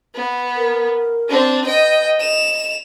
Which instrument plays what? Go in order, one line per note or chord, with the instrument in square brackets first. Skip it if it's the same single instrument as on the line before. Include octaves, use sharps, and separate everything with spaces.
[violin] B3
[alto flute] A#4
[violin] C4 D4
[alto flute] B4 [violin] D#5 G5
[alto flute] D#5 [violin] E7 F7